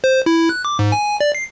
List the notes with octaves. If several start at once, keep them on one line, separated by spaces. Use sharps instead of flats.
C5
E4
F#6
D6
G#2
G#5
D5
C7